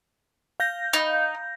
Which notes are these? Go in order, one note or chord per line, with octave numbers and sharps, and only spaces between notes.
F5 G6 A#6
D#4